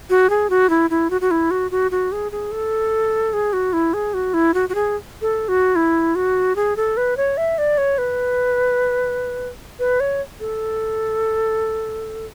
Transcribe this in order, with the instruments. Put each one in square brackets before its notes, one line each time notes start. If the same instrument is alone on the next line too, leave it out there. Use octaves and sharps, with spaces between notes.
[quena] F#4
G#4
F#4
E4
E4
F#4
F#4
E4
F#4
F#4
F#4
G#4
G#4
A4
G#4
F#4
E4
G#4
F#4
E4
F#4
F#4
G#4
A4
F#4
E4
F#4
G#4
A4
B4
C#5
E5
D5
C#5
B4
B4
C#5
A4